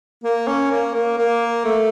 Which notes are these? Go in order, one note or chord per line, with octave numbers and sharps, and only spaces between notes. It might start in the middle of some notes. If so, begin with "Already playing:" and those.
A#3
C#4
A#3
A#3
A#3
A3